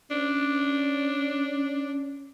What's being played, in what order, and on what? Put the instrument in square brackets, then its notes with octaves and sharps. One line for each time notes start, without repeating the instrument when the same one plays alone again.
[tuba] C#4 [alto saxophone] D4